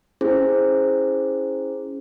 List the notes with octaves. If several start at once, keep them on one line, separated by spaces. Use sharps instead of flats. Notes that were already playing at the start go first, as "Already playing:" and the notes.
C#4 E4 G#4 C5